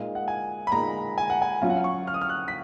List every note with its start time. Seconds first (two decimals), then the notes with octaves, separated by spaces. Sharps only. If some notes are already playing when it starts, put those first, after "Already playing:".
Already playing: A#2 G#3 D#4 F5
0.15 F#5
0.28 G#5
0.67 B5
0.72 A#2 G#3 D#4 A#5
1.18 G#5
1.30 F#5
1.42 G#5
1.62 F#3 C#4 F4 F5
1.70 F#5
1.77 F5
1.84 C#6
2.07 F6
2.14 D#6
2.21 F6
2.29 F#6
2.48 B6